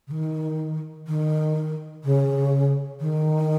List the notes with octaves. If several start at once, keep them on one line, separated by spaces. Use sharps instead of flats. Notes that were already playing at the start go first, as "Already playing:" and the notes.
C#3
D#3
D#3
C#3
D#3